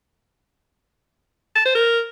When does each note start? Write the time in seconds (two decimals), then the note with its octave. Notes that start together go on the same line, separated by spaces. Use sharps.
1.56 A5
1.65 C5
1.75 A#4